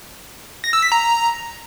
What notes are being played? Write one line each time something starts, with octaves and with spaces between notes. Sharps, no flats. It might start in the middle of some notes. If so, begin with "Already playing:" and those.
A#6
E6
B6
A#5